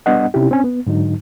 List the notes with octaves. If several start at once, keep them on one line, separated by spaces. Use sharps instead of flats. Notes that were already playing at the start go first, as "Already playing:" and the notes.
G3 B3 D4 D#5 F#5
C3 C#4 D#4 E4 G4
C4 C#4 G#5
B3
G#2 D3 F#3 D#4